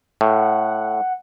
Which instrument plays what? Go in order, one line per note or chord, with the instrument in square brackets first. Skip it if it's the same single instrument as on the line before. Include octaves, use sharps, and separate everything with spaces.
[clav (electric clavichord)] A2 [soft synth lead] F#5